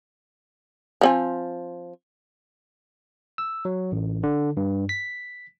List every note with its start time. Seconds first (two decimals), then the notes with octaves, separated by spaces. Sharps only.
1.01 F3 C4 G#5
3.38 E6
3.65 F#3
3.92 A1
4.23 D3
4.57 G2
4.89 B6